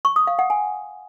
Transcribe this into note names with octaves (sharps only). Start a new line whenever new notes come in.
C#6
D#6
F5
F#5
G#5